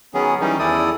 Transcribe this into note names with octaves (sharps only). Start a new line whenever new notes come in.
D#3 F#3 B3 C#4 G#4
D#3 E3 G3 C#4 D#4
E2 D#3 E4 A4 D5 D#6